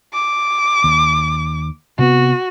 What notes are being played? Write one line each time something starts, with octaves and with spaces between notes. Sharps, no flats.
D6
D#2
C3 B3 F#4